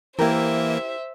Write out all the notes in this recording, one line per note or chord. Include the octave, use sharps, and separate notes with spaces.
E3 A#3 E4 G4 A#4 C5 E5